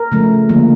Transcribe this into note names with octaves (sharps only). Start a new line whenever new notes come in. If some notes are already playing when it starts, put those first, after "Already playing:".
Already playing: A#4
C#3 F3 A3
D3 F3 A#3